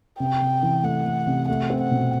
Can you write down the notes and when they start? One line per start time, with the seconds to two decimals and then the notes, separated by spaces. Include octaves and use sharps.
0.20 C3 G5
0.41 C3
0.63 E3
0.83 A3 F#5
1.06 A3
1.27 C3
1.48 A3 F#5
1.70 C4
1.81 F#5
1.91 B2